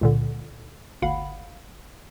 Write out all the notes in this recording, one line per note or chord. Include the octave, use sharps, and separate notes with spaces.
C#2 A#2 D3
G1 D2 F5 F#5 B5